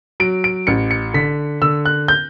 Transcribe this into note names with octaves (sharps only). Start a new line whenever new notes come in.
F#3 D7
D7
A1 C#7
C#7
D3 B6
D3 E6
F#6
G6